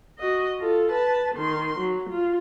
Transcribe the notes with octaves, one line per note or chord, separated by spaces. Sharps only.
F#4 D#5
F4 A4
B4 A5
D#3 C6
F#3
F4